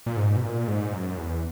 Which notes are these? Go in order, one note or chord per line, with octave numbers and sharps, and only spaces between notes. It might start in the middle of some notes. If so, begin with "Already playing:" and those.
A#2
G#2
B2
A#2
G#2
F#2
E2